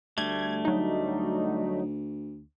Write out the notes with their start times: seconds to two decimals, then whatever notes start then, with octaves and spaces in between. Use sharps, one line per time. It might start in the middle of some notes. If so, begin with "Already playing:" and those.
0.18 D2 G3 A3 G#6
0.65 F#3 D#4